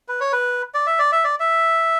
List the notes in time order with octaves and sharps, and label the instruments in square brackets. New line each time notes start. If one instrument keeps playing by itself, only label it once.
[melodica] B4
C#5
B4
D5
E5
D5
E5
D5
E5